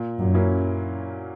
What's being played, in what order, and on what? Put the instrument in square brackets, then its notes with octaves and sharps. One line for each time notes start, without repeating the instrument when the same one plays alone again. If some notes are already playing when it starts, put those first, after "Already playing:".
Already playing: [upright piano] A#2
[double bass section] F#2
[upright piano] F#3 A#3 C#4 E4